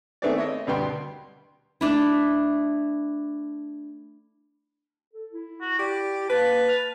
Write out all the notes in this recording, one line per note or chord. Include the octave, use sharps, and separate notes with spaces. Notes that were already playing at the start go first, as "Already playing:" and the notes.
D#3 A3 B3 C4 G#4 D5
E4 C#5 D#5
D2 B2 G3 B3 G5 C6
A3 D4 E4
A4
E4
F#4
G4 D5
A#3 B4 A5
F6